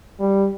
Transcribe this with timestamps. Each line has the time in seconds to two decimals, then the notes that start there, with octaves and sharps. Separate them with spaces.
0.20 G3